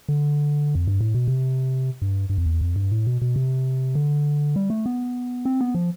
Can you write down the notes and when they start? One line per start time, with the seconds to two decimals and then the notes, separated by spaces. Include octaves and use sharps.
0.09 D3
0.75 F2
0.88 G2
1.01 A2
1.14 B2
1.28 C3
2.02 G2
2.30 G2
2.38 F2
2.46 E2
2.61 F2
2.76 G2
2.91 A2
3.07 B2
3.22 B2
3.36 C3
3.95 D3
4.56 G3
4.70 A3
4.86 B3
5.45 C4
5.61 B3
5.75 F3